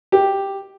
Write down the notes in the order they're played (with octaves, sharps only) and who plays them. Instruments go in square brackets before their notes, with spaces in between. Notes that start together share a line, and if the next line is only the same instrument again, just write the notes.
[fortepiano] G4